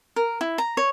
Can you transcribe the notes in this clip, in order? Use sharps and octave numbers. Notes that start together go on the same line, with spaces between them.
A#4
E4
A#5
C#5